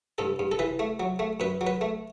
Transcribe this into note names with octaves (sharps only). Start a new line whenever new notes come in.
G2 A4
G2
A4
E3 B4
A3
F#3
A3
F#2 B4
F#3
B4
A3